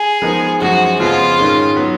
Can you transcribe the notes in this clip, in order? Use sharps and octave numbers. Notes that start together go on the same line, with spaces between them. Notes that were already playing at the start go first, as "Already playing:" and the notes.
Already playing: G#4
F3 G#3 B3 D#4 A#4
F#2 F3 G#3 F#4
F2 C#3 F3 G#3 B3 F4
G#2 D#3 G#3 C#4
F#3 B3